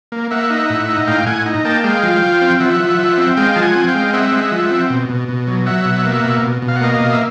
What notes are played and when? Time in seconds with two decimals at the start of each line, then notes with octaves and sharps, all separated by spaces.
0.12 A#3
0.31 A#3 E5 F#5
0.50 D#4
0.70 A2
0.89 D#4
1.07 A2 F5 G5
1.26 A2 F#5 G#5
1.46 D#4
1.65 A#3 G5 A5
1.83 G#3 F5 G5
2.03 F3
2.22 F3
2.42 C4
2.60 F3 E5 F#5
2.80 F3
2.99 F3
3.18 C4
3.37 G#3 F5 G5
3.56 F3 A5
3.62 F#5 G#5
3.75 C4
3.88 F5 G5
3.95 G#3
4.13 C4 E5 F#5
4.32 G#3
4.52 F3
4.71 C4
4.90 B2
5.09 B2
5.28 B2
5.47 F#3
5.66 F#3 E5 F#5
5.85 B2
6.04 A#3
6.24 B2
6.43 B2
6.62 B2
6.68 F5
6.76 F#5
6.81 A#3 D#5 F5
6.94 D#5 F5
7.00 B2
7.12 E5